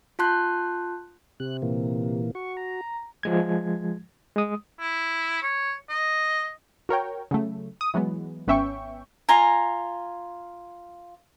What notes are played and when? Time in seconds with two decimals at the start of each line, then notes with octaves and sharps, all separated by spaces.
0.19 F4 A5 C6 F#6 G6
1.40 C3 F#6
1.62 A#2 E3 A#3
2.35 F#4 C#6
2.57 A#5
3.23 F3 G#3 G#6
4.36 G#3 D#6
4.80 E4
5.42 C#5
5.90 D#5
6.89 F#4 A#4 C#5 G5
7.31 C#3 F#3 A3
7.81 D#6
7.94 E3 F#3 G#3 B3
8.47 G#1 B3 C#4 E5 G5 C#6
9.29 F4 G#5 A#5